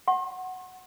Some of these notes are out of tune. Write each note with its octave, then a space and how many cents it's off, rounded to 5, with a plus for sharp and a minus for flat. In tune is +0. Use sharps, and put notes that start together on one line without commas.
F#5 +0 C6 +45